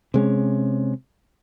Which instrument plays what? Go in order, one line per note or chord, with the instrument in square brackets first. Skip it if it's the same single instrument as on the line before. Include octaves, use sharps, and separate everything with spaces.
[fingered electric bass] C3 G#3 C#4